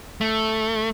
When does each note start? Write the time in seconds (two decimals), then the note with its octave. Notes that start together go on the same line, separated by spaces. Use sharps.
0.21 A3